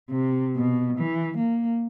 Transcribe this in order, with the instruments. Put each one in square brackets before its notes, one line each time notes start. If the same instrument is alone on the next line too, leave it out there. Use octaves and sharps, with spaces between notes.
[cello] C3
B2
E3
A#3